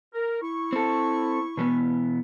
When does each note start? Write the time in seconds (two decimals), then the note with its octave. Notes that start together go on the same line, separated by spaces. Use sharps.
0.14 A#4
0.41 E4 C#6
0.73 C4 A4
1.57 B2 E3 B3